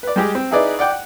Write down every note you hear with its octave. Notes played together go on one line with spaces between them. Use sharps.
B4 D5
G3 G#3 G4 G#4
C4
D#4 E4 G#4 B4 D5 D#5
D5 F#5 G5 D6
F#5